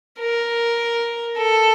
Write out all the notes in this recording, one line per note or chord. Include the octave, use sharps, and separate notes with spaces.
A#4
A4